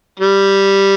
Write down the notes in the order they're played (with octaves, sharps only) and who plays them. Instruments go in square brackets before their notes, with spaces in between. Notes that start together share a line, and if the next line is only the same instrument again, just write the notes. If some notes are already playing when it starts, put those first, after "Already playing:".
[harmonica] G3